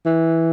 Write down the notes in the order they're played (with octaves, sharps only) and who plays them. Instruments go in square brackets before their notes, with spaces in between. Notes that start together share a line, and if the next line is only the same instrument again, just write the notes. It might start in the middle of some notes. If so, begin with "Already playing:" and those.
[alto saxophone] E3